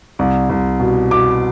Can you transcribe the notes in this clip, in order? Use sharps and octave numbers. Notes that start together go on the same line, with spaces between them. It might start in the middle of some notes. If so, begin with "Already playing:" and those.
C2
C2
B2
B2 D6